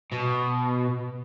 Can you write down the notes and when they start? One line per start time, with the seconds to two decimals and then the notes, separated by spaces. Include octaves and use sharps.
0.12 B2